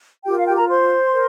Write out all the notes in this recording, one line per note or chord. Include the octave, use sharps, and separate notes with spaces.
F4 G4 A#4 G5
F5
G4 G5
A#4 A#5
C5 C6
A#4